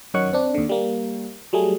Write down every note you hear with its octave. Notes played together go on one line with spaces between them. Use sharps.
F#2 D#3 D#4 C#5 F#5 C#6
C4 D4
D#2 D3
G3 A#3
F#3 G3 A3 G#4